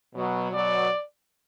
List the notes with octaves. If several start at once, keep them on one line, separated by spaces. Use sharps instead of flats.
B2 F#3
B2 F#3 D5